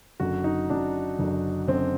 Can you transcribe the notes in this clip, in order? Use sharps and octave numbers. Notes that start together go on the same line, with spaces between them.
F#1 F#2 D3 F#3 F#4
D#4
F#1 F#2 D3 F#3 D4
F#1 F#2 D3 F#3
F#1 F#2 D3 F#3 C4